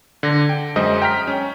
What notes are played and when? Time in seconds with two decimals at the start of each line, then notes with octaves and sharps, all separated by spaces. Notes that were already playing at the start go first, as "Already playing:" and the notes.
0.23 D3 A#6
0.49 G5
0.76 F#2 G#3 C5 D#5
1.02 G5 A#5 F6 B6
1.27 C#4